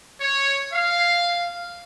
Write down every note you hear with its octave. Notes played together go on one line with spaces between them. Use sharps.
C#5
F5